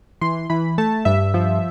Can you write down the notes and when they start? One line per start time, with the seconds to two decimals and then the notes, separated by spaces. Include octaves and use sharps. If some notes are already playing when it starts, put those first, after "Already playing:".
0.21 E3 C6
0.50 E3 B5
0.78 A3 A5
1.05 G2 E5
1.34 F3